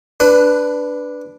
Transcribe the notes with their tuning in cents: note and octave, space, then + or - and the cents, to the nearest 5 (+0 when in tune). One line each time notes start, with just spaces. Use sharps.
D4 +0 B4 +0 B5 +40